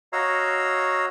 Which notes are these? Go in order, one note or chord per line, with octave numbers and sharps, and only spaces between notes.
F#4 C#5 D#5 F5 A#5 E6